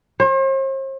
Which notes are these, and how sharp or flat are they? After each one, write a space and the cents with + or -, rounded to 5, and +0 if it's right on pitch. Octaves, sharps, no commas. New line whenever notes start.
C5 +45